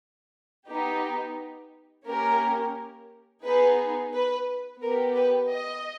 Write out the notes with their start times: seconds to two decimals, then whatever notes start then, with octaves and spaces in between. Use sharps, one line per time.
0.68 B3 D#4 G4
2.05 A#3 C#4 G4 A#4
3.44 B3 D#4 G#4 B4
4.13 B4
4.81 B3 G4 A#4
5.16 B4
5.51 D#5